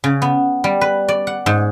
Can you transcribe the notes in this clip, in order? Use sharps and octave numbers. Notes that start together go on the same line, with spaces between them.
C#3
B3
G3
B4
D5
F#5
G#2